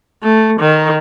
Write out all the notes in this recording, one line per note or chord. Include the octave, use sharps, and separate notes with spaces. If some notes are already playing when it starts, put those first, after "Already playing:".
A3
D#3